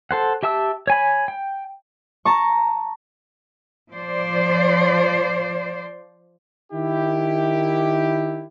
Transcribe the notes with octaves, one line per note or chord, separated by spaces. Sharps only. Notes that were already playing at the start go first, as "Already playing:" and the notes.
A4 C5 F#5
G4 E5 A5 E6
C#5 G#5 B5
G5
A5 A#5 C#6
F3 C5 D5
D#3 E4 G4